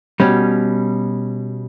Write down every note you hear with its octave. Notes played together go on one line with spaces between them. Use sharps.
B2 G3 C#4